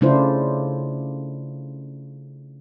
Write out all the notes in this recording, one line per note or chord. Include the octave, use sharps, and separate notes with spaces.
C#3 A3 D4 E4 F4 C5